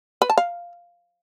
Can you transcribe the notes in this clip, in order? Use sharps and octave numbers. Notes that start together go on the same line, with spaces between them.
B4
A5
F5